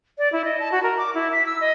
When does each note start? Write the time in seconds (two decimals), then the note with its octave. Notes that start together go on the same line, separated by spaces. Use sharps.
0.18 D5
0.32 E4
0.45 D#5
0.60 A5
0.72 F#4
0.83 A#4
0.97 D6
1.15 E4
1.32 B6
1.46 E6
1.61 D#5